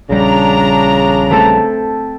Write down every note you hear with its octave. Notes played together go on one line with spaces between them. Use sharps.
A#1 C#3 G3 D4 A#5
A3 C4 A4